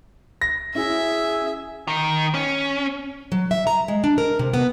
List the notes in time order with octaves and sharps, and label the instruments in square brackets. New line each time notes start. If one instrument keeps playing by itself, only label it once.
[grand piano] A#6
[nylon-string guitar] C#4 E4 F#4 [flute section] G#4 E6 [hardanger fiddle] E5
[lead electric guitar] D#3
C#4
[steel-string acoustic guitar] F#3
E5
A#5
G#3
D4
A#4
C3
B3